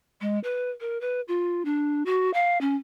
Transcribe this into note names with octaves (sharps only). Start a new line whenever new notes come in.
G#3
B4
A#4
B4
F4
D4
F#4
F5
C#4